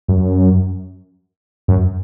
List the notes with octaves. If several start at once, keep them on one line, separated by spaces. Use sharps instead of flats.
F#2
F#2